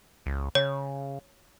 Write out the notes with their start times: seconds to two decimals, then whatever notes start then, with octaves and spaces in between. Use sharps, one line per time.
0.26 C#2
0.55 C#3 C#5